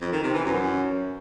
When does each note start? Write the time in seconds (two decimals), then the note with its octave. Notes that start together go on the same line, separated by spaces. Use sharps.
0.01 F2
0.12 D#3
0.23 C3
0.34 E3
0.45 F#2